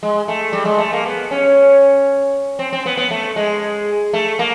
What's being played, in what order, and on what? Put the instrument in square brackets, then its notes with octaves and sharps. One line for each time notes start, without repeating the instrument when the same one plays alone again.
[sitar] G#3
A3
G3
G#3
A3
A#3
B3
C#4
C4
C4
B3
B3
A3
G#3
A3
A#3